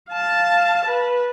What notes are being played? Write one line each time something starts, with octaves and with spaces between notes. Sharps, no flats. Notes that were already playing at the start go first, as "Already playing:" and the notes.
F5 A5
B4